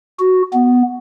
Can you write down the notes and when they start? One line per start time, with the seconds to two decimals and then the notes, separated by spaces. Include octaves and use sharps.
0.19 F#4
0.53 B3